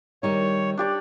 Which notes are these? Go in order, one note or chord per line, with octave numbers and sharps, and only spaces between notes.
D#3 G3 D#4 C#5
D4 G4 D5